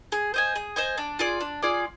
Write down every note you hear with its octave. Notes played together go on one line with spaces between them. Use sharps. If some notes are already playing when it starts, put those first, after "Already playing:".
G#4
C5 D#5 G#5
G#4
C5 D#5 G#5
D4
F4 G#4 D5
D4
F4 G#4 D5